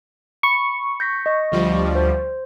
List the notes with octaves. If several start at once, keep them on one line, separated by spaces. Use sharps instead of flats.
B5 C#6
G6 A#6 B6
D#5 A#6
D2 F3 G3
C5